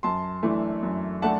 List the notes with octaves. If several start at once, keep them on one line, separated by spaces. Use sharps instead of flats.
F#2 A5 C6
E3 A3 D4
F#2
A3 D4 F#5 A5